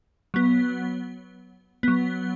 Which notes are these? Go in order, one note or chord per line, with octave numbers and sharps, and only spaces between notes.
F#3 B3
F#3 B3